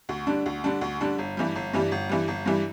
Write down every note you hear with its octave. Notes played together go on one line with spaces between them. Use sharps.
D2
D3 G3 D4
D2
D3 G3 D4
D2
D3 G3 D4
G1
G2 E3 G3
G1
G2 E3 G3
G1
G2 E3 G3
G1
G2 E3 G3